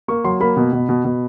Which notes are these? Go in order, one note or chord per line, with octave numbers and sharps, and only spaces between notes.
A#3 C#6
F#3 C6
A#3 B5
B2
B2
B2
B2